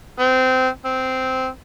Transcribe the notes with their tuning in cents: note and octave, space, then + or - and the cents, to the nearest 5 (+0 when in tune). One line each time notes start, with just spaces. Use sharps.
C4 -20
C4 -10